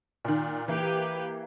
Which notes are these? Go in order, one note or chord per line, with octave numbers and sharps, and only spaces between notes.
A#2 D#3
E3 A#3 G4 B4